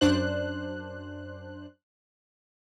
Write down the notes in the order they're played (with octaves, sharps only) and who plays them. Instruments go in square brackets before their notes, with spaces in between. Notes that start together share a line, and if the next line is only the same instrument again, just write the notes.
[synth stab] F#2 D4 C5 F#6